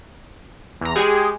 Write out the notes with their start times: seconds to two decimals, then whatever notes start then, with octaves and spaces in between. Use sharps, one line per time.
0.81 E2 A#5
0.96 G#3 G4 G#4